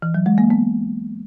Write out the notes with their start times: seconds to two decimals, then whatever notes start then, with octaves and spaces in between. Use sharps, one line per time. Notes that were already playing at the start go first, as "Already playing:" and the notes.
0.02 E3
0.14 F#3
0.26 G#3
0.38 A#3
0.50 B3